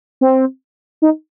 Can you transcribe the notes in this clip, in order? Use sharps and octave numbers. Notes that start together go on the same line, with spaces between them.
C4
D#4